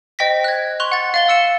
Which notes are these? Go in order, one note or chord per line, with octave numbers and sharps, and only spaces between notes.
C5 D#5 G5 A#6 B6
F#6 G#6
C6 C#6 F#6 F7
F#5 A6
F5 A6 G7
E6 C#7 E7